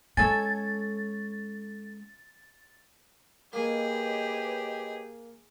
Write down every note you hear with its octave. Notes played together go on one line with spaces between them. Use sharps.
G#3 C#4 A4 C#5 G#5 A6
A#3 G4 G#4 B4 C#5 D#5